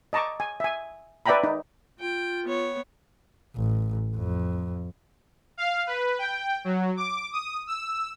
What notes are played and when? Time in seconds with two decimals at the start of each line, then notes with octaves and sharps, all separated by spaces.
0.13 D#5 A5 A#5 C#6 D6
0.40 G#5
0.60 E5 G#5
1.26 B4 D5 E5 G5 A#5 B5
1.44 D#4
2.00 F4 G5
2.45 B3 C#5
3.56 A1
4.15 F2
5.57 F5
5.87 B4
6.19 G5
6.65 F#3
6.97 D6
7.32 D#6
7.67 E6